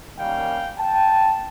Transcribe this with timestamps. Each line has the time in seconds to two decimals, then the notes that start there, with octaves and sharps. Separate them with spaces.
0.18 D#3 G3 A#3 C#4 F5 G5
0.78 G5 A5